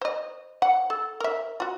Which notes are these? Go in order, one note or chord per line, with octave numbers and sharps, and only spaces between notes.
C5 D#5
F#5
A4
A#4 E5
F4 F#4